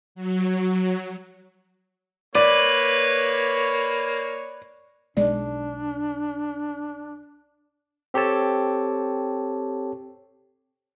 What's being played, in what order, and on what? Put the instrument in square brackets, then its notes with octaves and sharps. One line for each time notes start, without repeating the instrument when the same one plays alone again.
[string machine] F#3
[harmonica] A#3 [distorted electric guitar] B4 [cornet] C#5 [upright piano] D5
[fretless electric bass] B1 G#3 [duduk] D4 [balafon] D5
[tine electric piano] C4 G4 A4 C#5 A5